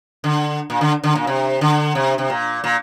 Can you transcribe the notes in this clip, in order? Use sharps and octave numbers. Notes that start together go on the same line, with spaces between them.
D3
A#2
D3
D3
A#2
C3
D3
C3
C3
A#2
A#2